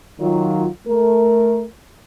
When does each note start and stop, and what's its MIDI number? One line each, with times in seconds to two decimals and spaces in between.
0.20 0.66 51
0.20 0.66 54
0.20 0.66 65
0.87 1.64 57
0.87 1.64 70